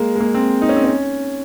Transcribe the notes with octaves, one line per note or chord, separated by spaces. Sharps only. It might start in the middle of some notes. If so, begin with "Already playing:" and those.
Already playing: G#3 A#3
G#3
A#3
C4
D#4
C#4
C4
C#4